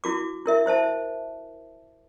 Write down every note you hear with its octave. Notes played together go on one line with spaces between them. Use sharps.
E4 F#4 D6
E4 A#4 E5
E4 C5 E5 A5